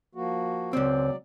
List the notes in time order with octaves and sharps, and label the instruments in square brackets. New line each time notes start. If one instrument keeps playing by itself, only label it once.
[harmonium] F3 A#3 F#4
[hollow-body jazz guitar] C#2 C4 [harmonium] F#3 D5